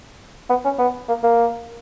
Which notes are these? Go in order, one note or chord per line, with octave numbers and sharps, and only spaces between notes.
B3
C#4
B3
A#3
A#3